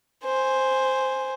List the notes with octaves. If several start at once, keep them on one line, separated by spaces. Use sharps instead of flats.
C5 G#5